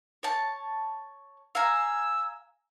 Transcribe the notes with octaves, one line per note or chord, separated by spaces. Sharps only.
C#5 A5
F5 G#5 A#5 E6